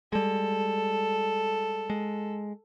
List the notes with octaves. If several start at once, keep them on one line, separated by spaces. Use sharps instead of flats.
G3 G#3 A4
G#3